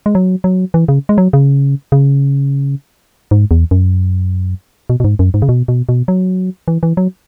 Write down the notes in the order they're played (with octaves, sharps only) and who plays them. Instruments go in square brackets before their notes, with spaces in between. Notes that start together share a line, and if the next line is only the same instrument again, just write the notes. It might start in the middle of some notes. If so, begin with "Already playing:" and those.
[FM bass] G#3
F#3
F#3
E3
C#3
G#3
F#3
C#3
C#3
G#2
E2
F#2
B2
B2
G#2
F#2
G#2
C#3
B2
B2
B2
F#3
E3
E3
F#3